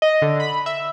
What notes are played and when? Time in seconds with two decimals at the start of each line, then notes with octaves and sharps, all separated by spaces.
0.02 D#5
0.22 D3
0.40 B5
0.66 E5